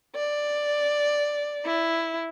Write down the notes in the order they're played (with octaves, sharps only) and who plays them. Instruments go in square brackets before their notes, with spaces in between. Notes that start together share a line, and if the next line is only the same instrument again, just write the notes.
[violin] D5
E4